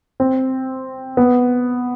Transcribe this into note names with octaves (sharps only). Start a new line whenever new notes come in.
C4
B3